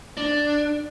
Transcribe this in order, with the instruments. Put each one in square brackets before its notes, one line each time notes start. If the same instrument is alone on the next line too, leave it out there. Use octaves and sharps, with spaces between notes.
[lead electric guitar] D4